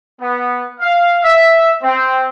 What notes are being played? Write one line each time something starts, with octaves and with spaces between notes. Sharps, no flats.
B3
F5
E5
C4